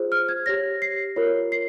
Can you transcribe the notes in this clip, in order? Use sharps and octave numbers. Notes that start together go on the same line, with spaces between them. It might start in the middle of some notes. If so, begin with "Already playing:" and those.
Already playing: F4 G#4 C5
F6
G#6
G4 C#5 A#6
C7
F4 A#4 C#5
C7